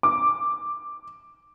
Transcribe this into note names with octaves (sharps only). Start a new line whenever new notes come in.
D6